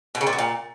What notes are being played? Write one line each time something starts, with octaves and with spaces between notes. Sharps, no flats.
B2
C#3
A#2
F#3
A#2